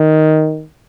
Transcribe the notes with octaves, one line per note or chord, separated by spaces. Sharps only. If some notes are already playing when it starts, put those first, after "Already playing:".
Already playing: D#3